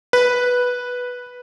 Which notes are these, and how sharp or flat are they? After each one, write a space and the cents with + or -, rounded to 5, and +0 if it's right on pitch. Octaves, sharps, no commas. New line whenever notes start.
B4 -5